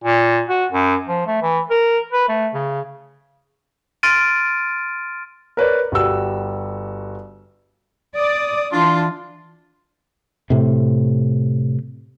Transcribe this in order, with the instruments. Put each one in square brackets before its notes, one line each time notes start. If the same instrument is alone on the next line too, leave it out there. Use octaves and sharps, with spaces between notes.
[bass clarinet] A#2
F#4
F#2
F3
A3
E3
A#4
B4
A3
C#3
[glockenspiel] C6 F6 A6 D7 D#7
[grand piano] A#4 B4 C#5 D5
G1 G3 F#4 E6
[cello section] D5 [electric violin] D#6
[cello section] E3 [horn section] D4 A5 C6 [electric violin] F4
[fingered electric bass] A2 C3